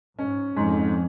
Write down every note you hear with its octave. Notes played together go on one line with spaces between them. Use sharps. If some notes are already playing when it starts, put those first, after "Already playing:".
G#2 C#4
F2 G#2